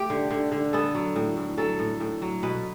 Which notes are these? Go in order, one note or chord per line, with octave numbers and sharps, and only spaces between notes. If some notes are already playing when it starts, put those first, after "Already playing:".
Already playing: A3 G4
D3
D3
D3
B3 A4
F#3
A2
A2
F#3 A4
A2
A2
F#3
B2 B4